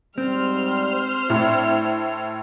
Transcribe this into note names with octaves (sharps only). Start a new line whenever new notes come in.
G#2 G3 C4 C5 F6
A2 D4 E4